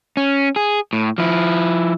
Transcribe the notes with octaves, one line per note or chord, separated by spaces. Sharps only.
C#4
G#4
A2
F3 E4